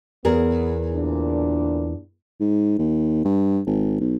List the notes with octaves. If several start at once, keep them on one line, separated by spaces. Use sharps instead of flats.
E2 B3 G#4 A#4
D2 A#2 D4
G#2
D#2
G2
G#1
B1